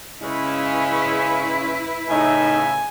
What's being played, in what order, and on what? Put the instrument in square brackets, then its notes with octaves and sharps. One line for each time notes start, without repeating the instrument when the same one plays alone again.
[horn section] C#3 G#3 C#4 [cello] E4 B4
[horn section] A2 C#3 E5 [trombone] D#4 [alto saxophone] G#5